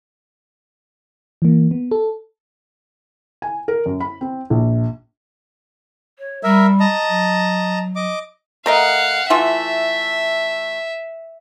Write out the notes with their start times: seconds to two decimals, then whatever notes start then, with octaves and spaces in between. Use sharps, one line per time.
1.42 E3 A#3
1.71 B3
1.91 A4
3.42 G#5
3.68 A#4
3.86 F#2
4.00 B5
4.21 C4
4.50 A#1
6.19 C#5
6.44 G3 A#4 E5
6.80 D#5 A5 A#5
7.09 F#3
7.96 D#5 D6
8.66 A3 A#4 D#5 F5 F#5
9.30 E3 A3 F4 E5